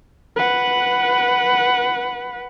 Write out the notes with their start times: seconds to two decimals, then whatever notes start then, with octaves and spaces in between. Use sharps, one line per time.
0.36 B4 F#5